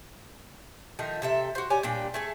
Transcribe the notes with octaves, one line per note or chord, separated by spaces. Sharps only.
D#3 F3 A3 D#4
C3 A4 E5
F#4 C5
G4 C#5 D5 G#5
A#2 G3 D4 G5
A3 G#4 A4